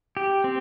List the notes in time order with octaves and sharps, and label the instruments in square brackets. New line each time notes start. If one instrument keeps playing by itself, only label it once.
[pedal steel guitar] G4
C4